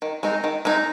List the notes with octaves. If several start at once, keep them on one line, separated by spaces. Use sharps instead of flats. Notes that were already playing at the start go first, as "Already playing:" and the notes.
D#3
G#3 C4 D#4
D#3
G#3 C4 D#4